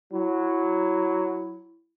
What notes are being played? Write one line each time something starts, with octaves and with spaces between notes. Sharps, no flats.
F#3 E4